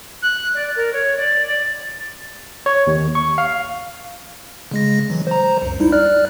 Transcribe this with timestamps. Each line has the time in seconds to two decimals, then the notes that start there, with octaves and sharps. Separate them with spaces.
0.22 F#6
0.54 D5
0.75 A#4
0.92 C#5
1.17 D5
1.46 D5
2.66 C#5
2.87 D#2
3.15 C#6
3.38 F5
4.71 C#3 G#3 A#6
5.10 E3 F#3
5.27 C5 A#5
5.62 C#2 F#2
5.80 G3 D#4 E4
5.92 D5 F6 F#6